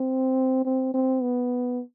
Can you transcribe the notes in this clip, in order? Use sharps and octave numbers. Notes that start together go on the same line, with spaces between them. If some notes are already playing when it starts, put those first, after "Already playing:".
Already playing: C4
C4
C4
B3